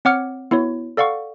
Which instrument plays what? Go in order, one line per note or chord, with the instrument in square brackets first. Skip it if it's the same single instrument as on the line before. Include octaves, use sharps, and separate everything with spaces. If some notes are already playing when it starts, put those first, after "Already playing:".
[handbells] C4 C#5 F#5 D6 F6 C#7
B3 E4 F#4 C#5
A4 D5 F5 F#5 C#6